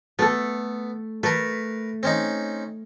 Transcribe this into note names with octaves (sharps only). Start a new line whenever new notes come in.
A3 B3 A4
A3 A#4 B4
C4 C#4 D#4